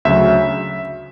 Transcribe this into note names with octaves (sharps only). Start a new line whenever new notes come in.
D2 C#3 F#3 E5